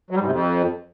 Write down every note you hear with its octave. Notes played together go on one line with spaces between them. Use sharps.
F#3
G3
G#2
C3
F2